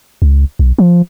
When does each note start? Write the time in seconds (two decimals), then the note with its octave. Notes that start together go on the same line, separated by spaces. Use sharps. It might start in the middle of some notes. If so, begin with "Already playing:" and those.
0.22 C#2
0.59 B1
0.79 F3